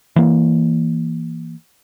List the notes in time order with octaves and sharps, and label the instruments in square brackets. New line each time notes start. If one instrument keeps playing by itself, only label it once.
[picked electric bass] E3 A#3